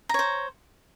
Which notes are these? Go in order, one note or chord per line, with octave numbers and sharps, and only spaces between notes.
C5 C#5 A#5